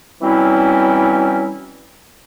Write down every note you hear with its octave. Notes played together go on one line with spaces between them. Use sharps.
E3 F#3 G3 C4 C#4 E4